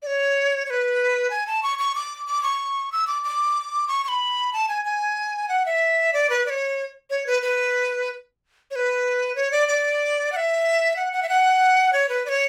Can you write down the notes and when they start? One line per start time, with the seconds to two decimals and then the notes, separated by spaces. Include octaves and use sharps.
0.02 D5
0.07 C#5
0.66 C#5
0.70 B4
1.30 G#5
1.47 A5
1.63 C#6
1.79 C#6
1.95 D6
2.27 D6
2.43 C#6
2.92 E6
3.07 D6
3.24 D6
3.88 C#6
4.04 C#6
4.08 B5
4.53 A5
4.69 G#5
4.85 G#5
5.49 F#5
5.66 E5
6.13 D5
6.30 B4
6.46 D5
6.50 C#5
7.10 C#5
7.27 B4
7.42 B4
8.71 C#5
8.76 B4
9.36 C#5
9.52 D5
9.68 D5
10.32 F#5
10.36 E5
10.96 F#5
11.13 F#5
11.23 E5
11.29 F#5
11.93 C#5
12.09 B4
12.26 D5
12.29 C#5